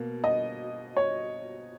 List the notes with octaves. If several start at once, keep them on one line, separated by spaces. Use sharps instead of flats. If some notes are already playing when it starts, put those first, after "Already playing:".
Already playing: B2 A#3
D#5
C#5